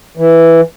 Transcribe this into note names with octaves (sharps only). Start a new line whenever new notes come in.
E3